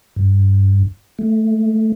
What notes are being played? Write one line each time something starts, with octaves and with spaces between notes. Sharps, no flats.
G2
A3